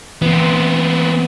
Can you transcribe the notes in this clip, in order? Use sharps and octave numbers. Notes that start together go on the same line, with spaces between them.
E3 B3 C4